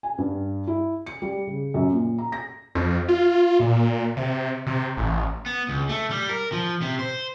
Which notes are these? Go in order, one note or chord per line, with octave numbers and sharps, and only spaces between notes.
G#5
G2
E4
C#7
G3
C#3
F#2
A#2
A#5
A#6
F2
F4
A#2
C3
C3
A1
B3
C#2
A3
G3
A#4
F3
C3
C5